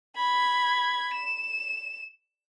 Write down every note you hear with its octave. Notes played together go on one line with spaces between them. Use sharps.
B5 G#6
E7